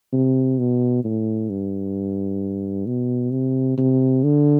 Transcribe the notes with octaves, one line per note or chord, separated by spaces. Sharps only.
C3
B2
A2
G2
B2
C3
C3
D3